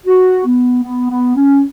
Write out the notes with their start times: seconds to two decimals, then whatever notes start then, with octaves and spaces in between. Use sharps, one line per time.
0.06 F#4
0.46 B3
0.83 B3
1.10 B3
1.36 C#4